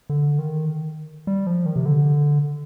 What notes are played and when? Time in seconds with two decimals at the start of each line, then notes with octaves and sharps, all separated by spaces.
0.10 D3
0.39 D#3
1.27 G3
1.47 F3
1.66 D#3
1.76 C3
1.86 D3